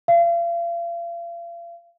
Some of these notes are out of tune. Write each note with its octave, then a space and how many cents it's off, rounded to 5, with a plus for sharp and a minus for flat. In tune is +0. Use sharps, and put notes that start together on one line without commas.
F5 -40